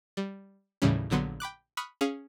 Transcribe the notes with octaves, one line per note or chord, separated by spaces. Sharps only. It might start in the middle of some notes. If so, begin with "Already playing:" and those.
G3
D#2 A2 C#3 E3 G3 C#4
A#1 D3 F#3 B3 C6
G5 B5 D6 F#6
B5 C#6 D#6 F6 F#6
C#4 G#4 F5